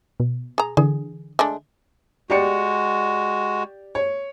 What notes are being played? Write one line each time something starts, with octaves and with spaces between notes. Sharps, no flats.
B2
G#4 A#5
D3 E3 G#4
G#3 A3 D4
G#3 F#4 G4 D5 C#7
C#5